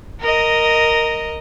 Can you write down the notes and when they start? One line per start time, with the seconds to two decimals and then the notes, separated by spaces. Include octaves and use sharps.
0.21 A#4 D#5